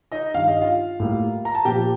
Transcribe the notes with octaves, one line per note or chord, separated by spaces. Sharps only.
D#4 D#5
G2 D#3 G3 F5
D#5
F4 F5
A2 G3 A#3
A#5
A5
A#2 F3 A#3 G4 G5